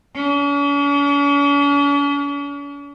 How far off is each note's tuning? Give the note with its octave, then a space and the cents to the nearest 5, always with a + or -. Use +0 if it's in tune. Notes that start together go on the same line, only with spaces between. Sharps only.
C#4 +45